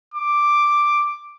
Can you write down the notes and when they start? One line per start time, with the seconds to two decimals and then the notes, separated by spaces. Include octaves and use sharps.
0.14 D6